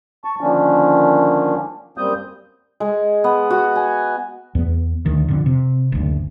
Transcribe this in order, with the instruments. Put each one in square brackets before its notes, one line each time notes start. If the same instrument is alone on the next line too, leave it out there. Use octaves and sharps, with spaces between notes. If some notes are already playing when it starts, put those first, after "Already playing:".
[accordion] A5 C#6
D3 D#3 F3 A#3 C#4 D4
F#2 G3 A#3 C4 D#6 G6
[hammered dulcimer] G#3
B3
F#4
G#5
[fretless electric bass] E2 B3
D2 D#3
F2 D3
C3
F#1 D2